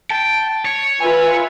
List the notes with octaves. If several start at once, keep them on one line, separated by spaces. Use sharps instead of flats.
G5 A5
C#5
F4 B4 E5 G#5